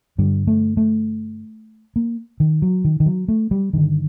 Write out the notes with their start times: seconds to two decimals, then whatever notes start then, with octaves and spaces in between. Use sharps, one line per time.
0.18 G2 D3 G3
0.47 A3
0.77 A3
1.96 A#3
2.40 D#3
2.62 F#3
2.85 D#3
3.00 D#3
3.06 F#3
3.28 A3
3.51 G3
3.73 G2 D3 D#3